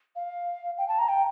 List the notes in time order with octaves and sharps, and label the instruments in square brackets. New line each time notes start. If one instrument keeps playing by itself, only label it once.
[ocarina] F5
G5
A5
A#5
G5